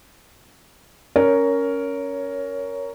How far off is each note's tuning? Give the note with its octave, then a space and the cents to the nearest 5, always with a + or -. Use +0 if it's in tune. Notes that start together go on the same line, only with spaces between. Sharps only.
C#4 +0 A#4 +0 C#5 +15